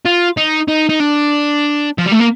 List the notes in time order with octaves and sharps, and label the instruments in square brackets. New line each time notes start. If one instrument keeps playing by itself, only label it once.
[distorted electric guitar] F4
D#4
D#4
D#4
D4
F3
G3
A3
A#3